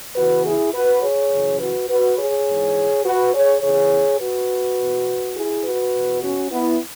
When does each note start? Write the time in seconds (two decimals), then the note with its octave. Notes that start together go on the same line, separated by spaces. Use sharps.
0.16 E2 C#3 E3 F#4 B4
0.45 E4 G#4
0.73 F#4 B4
1.02 G#4 C#5
1.32 F#2 C#3 E3
1.60 F#4 B4
1.89 F#4 B4
2.18 G#4 C#5
2.48 G#2 E3
3.05 F#4 B4
3.34 G#4 C#5
3.62 E2 C#3 E3 G#4 C#5
4.20 F#4 B4
4.79 E2 B2
5.36 E4 G#4
5.65 F#4 B4
5.94 E2 B2
6.22 C#4 F#4
6.51 B3 E4